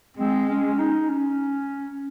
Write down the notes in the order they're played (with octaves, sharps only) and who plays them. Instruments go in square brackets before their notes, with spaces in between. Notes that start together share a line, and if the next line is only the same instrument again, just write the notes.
[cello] G#3 [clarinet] C4
[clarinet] C#4
D#4
C#4